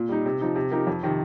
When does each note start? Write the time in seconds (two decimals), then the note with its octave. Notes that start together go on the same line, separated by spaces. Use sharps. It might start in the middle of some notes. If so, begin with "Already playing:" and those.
Already playing: A#2
0.09 G3 D#4
0.26 C3
0.41 F3 D#4
0.56 C3
0.71 F3 D#4 G4 A#4
0.87 F2
1.03 C3 D#3